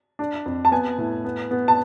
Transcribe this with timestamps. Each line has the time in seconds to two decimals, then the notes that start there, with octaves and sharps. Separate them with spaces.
0.19 D4
0.46 F2
0.65 A5
0.72 B3 G#5
0.98 A2
1.24 B3
1.51 B3
1.68 A5